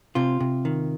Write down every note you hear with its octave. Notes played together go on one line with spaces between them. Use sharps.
C3 F4
C3
D#3